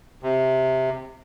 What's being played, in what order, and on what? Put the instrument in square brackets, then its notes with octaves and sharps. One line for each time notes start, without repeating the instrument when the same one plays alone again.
[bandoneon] C3